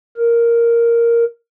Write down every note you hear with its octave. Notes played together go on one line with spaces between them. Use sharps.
A#4